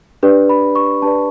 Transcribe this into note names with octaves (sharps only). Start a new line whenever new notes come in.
D4 G4 B4 D5
B5
C#6
D4 G4 B4 D5 A5